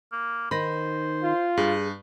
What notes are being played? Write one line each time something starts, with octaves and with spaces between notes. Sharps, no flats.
A#3
D#3 C5 B5 A#6
F4
G2 G#4